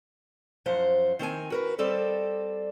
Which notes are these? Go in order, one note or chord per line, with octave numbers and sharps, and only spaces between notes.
F#2 F3 C5 F#5
D#3 C4 A#4 G#5
F#4 A#4 B4
G3 C4 A4 D5 D#5